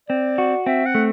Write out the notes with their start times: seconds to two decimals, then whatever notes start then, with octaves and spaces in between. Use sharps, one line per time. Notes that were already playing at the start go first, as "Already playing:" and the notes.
0.09 C4 D5
0.38 F#4
0.66 C4 E5
0.86 F#5
0.95 A3